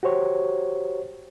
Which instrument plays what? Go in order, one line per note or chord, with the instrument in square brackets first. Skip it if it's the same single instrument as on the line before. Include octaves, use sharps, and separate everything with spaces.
[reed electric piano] F#4 G4 C5 C#5